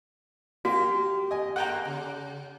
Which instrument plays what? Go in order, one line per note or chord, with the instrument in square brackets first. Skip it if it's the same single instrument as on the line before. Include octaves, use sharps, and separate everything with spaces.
[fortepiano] A#3 [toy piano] F#4 [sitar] G4
[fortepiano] D#5 G#5
[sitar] G#3 A#3 [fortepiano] F#5 G5 A#5
[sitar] C#3